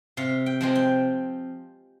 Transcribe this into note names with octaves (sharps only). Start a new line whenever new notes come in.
C3 F5
G5
F3 G#3 C4
G5